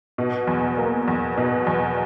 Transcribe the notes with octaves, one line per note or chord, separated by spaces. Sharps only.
B2
E2
A#3
E2
B2
E2